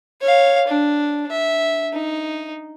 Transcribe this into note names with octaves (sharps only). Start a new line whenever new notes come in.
C#5 F5
D4
E5
D#4